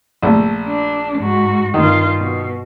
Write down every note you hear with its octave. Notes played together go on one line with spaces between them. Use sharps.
A#1 A3
D4
G#2 F#4
G2 D#3 F4
B2